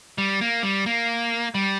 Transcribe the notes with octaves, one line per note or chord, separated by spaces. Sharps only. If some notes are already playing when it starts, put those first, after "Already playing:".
G3
A#3
G3
A#3
G3